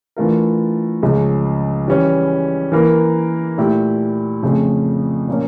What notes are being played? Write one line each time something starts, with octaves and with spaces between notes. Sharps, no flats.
E3 A3 D4 F4 A#4
C#2 C#3 F3
E3 G3 C#4
E3 A#3 E4 A#4
A#2 A3 E4 G4
F2 C#3 F3 A3
A#2 F3 A#3 C#4